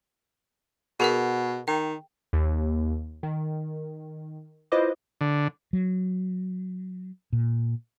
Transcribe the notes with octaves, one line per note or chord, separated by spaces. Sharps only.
B2 G#4 A#4 F#5
D#3 G5
D#2
D#3
E4 F4 B4 C5 D#5 D6
D3
F#3
A#2